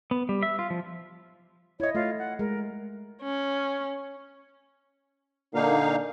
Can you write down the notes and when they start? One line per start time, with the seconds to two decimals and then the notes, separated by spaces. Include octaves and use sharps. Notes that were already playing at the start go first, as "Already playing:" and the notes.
0.11 B3
0.29 G3
0.43 E5
0.59 F4
0.70 F3
1.80 E4 C#5 D#5
1.95 A3 F4
2.19 F#5
2.39 G#3 A#4
3.23 C#4
5.55 A#2 D3 A#3 D#4 F5